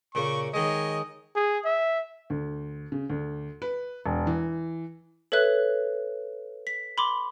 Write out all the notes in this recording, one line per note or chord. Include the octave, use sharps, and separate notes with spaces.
A#2 C#3 A#3 C#6
D#3 G#3 C#5 D#5
G#4
E5
D2
C#3
D2
B4
E1
E3
A4 B4 C#5 E5 F#6
B6
B5 C6 D6